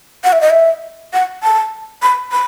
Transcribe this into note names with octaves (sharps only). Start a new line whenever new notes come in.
F#5
E5
D#5
E5
F#5
A5
B5
B5